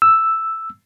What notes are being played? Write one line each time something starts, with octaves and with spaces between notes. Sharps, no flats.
E6